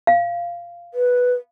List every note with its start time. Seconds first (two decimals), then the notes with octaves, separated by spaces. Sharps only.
0.07 F5
0.94 B4